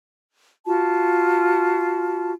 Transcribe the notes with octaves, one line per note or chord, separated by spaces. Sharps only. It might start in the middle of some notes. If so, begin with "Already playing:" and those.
F4 F#4 A5